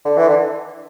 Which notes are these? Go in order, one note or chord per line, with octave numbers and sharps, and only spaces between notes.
D3
E3
D3